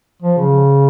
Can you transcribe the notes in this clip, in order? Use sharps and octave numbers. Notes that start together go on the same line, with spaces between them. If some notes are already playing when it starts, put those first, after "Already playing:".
F3
C#3